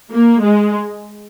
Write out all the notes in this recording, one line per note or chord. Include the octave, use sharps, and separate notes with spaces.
A#3
G#3